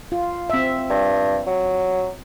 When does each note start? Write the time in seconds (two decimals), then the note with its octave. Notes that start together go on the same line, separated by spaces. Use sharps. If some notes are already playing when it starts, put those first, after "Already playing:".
0.12 F4
0.50 C4 E5
0.90 G2
1.47 F#3